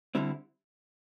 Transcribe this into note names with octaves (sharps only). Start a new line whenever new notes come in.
D3 G3 C4 E4